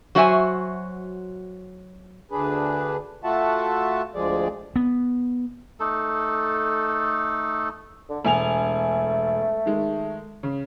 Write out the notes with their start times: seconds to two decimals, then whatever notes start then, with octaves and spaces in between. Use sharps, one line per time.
0.15 F#3 F#4 C5 E5 G5 G#5
2.31 D2 D4 G#4 B4
3.24 A3 F4 F#4 E5 F#5 A5
4.15 D2 F3 G#3 G#4 D5
4.76 B3
5.80 A3 D#4 A4
8.10 D3
8.25 E1 A3 G#5 F7
9.66 D#3 G#3
10.43 C#3